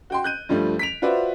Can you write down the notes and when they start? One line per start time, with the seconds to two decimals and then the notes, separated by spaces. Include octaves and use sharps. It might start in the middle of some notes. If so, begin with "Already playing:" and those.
0.10 F#4 G5 C6
0.24 F#6 G6 D#7
0.49 G2 F3 G3 A3
0.79 B6 D7 F7
1.02 F4 F#4 B4 C5 D5 E5